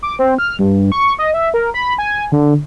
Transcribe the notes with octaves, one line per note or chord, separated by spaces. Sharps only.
D6
C4
F6
G2
C#6
D#5
E5
A#4
B5
G#5
D3